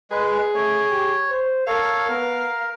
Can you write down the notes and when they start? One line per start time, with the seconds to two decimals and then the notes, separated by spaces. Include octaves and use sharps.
0.11 G#3 G#4 B4
0.54 A3 C#5
0.90 G4
1.30 C5
1.67 A4 A#4 C#5 F5
2.09 B3 A#4